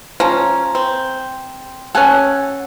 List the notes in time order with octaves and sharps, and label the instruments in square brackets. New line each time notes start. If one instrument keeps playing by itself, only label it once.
[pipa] F3 C#4 [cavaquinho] A#5
[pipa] C4
[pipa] C#4 A4 [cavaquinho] F#5 G#5